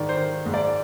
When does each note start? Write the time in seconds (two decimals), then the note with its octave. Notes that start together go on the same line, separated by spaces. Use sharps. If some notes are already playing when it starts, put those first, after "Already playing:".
Already playing: G#2 D#3 D5
0.09 C5
0.17 D#3
0.46 G#2
0.54 D5